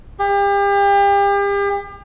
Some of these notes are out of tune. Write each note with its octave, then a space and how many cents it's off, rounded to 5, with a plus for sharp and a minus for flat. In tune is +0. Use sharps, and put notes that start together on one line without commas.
G4 +40